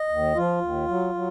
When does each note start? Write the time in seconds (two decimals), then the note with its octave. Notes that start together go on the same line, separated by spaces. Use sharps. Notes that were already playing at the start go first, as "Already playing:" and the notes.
Already playing: D#5
0.09 D#2
0.35 F3 F4
0.61 D#2
0.88 F#3
1.14 F#3